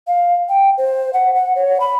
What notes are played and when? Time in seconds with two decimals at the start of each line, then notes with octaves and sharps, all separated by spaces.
0.07 F5
0.49 G5
0.78 C5
1.13 F#5
1.35 F#5
1.56 C#5
1.80 B5